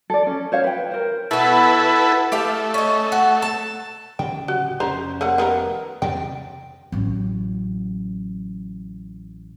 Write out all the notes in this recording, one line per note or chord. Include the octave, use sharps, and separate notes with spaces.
A4 D5
C#4
C5 C#5 F5
B4 G5
A#4 C5
B2 B3 E4 A4 B4
A3 G4 E5 F5
C#4 D#5
F#4
A5
D1 C#3 G5
F#4
F1 C#4 C5 A#5
A3 A#3 F#5
D#3 B3 A#4
E2 G2 C3 G5
A1 F#3